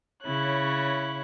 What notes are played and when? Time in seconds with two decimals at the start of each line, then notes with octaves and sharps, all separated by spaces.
0.23 C#3 E4 C#5 F#6